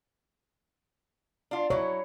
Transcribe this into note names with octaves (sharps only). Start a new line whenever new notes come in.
D4 F4
F#3 E4 C#5